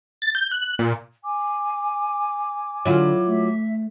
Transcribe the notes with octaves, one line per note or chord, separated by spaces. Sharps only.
A6
G6
F#6
A#2
G#5 D6
D3 F#3 E4 F4
A3 E5